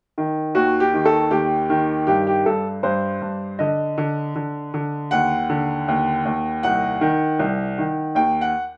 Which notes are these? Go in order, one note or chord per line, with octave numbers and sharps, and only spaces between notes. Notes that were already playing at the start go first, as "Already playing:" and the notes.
D#3
D#2 F#4
G4
D#3
A4
D#2 G4
D#3
G2 G4
G4
G2 A4
G2 C5
G2
D3 D#5
D3
D3
D3
D#2 F#5
D3
D#2
D#2
C2 F#5
D#3
C2
D#3
D#2 G5
F#5